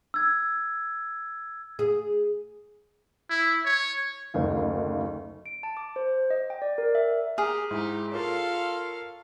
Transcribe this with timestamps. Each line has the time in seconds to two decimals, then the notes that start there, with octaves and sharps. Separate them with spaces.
0.14 E6 G#6
1.79 G#4
3.30 E4
3.65 C#5
4.34 F#1 D2 D#3 F5
5.46 D7
5.63 A5
5.77 D6
5.96 C5
6.30 D#5
6.50 G5
6.62 D5
6.78 A#4
6.95 E5
7.38 G4 G#4 A#5 F6
7.71 G#2 D#4 E4 G4
8.12 F4 A4 A#4 C#5 F5